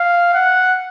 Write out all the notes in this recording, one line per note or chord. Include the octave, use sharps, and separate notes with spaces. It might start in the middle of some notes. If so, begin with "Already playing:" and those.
Already playing: F5
F#5